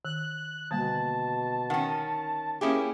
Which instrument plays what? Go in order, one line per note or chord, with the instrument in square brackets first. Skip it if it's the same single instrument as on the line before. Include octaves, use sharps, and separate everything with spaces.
[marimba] D#3 [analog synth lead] F#6
[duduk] B2 [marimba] D3 G3 A#3 [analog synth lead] A5
[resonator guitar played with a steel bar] D#3 C#4 [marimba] F#5 G5
[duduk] A#3 [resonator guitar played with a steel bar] C#4 E4 G4 [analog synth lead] G#4